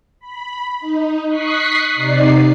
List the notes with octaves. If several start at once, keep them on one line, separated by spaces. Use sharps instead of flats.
B5
D#4
C#6 D#6 F#6 B6 C7
C3 D#4 D5 C7